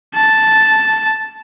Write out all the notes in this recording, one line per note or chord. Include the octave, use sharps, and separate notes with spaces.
A5